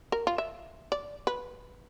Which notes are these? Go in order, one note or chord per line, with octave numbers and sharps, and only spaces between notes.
A#4
F4
E5
D5
B4